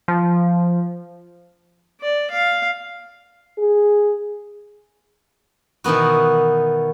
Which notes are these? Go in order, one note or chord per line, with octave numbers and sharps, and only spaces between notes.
F3
D5
F5
G#4
B2 D#3 E3 B3 F#4